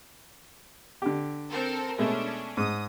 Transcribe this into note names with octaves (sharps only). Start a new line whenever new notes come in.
D3 G4
C4 A4 A#4
B2 G#3 A3 C#4 D4
G#2 D#6